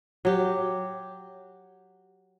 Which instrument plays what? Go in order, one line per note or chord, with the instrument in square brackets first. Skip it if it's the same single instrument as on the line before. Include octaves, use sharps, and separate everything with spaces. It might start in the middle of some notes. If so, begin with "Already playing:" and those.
[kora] F#3 G4